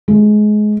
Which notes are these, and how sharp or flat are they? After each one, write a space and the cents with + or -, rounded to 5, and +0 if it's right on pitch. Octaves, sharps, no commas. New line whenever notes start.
G#3 +25